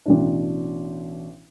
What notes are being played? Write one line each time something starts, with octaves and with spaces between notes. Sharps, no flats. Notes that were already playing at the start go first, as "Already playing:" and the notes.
A1 B2 D4